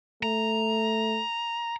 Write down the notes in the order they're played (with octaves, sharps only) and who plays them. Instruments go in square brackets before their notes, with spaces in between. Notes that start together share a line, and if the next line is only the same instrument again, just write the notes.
[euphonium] A3 [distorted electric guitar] A#5